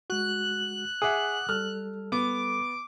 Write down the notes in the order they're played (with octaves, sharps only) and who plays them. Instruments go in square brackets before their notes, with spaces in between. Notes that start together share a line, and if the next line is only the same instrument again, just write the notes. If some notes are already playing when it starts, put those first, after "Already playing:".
[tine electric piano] G#3 F#4 [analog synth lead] F#6
[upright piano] G#4 E5 [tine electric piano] F#5 D6 D#6
[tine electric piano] G3 A4 [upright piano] F6
[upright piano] B3 [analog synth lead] D6